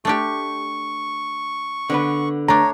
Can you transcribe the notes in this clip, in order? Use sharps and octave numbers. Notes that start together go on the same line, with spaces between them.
A3 D4 G4 C#6
D3 B3 B4
A3 D4 C#5 A#5